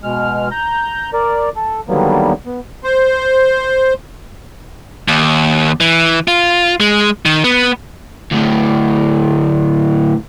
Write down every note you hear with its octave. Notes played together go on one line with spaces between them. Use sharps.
B2 G#3 F6
A#5 G6
A#4 D5
A4
D3 D#3 F#3 G3 A#3 B3
B3
C5
D#2
E3
F4
G#3
D#3
B3
D2 A2